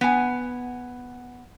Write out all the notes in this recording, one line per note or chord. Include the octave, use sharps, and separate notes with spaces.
B3 G#5